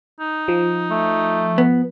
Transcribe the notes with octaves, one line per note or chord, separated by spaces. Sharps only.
D#4
F3
A3
B3